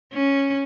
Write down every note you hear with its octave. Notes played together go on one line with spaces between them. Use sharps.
C#4